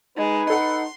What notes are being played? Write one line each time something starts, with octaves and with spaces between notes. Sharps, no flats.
G#3 D#4 B4
A4 F#5 C6